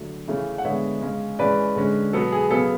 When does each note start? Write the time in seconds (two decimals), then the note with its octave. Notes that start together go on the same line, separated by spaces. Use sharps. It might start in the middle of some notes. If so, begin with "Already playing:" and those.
Already playing: D3 F#3 A3
0.28 C#3 E3 A3 C#4
0.58 F#5
0.65 D3 G#3 B3 C#5 E5
1.02 C#3 G#3 C#4
1.39 E3 G#3 C#4 B4 D5
1.76 D3 G#3 C#4
2.13 B2 F#3 B3 A4
2.32 G#4
2.51 C#3 F#3 B3 A4